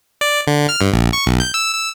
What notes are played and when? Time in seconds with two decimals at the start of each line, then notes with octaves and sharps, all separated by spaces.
0.21 D5
0.47 D3
0.69 F6
0.81 G2
0.93 A#1
1.13 C#6
1.26 B1
1.40 G6
1.54 E6
1.73 E6